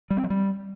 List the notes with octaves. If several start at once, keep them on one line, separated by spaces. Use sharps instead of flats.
G3
C4
F#3
G3